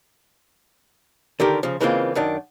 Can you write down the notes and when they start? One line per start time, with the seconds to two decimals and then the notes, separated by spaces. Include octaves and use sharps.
1.40 D3 D#3 G4 A#4
1.63 C#3 F3
1.80 C#3 E3 G#3 A#3 C4 F4
2.15 F#2 D#3 D4